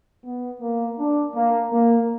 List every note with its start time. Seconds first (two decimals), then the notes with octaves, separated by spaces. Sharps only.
0.25 B3
0.61 A#3
0.99 D4
1.35 A#3
1.71 A#3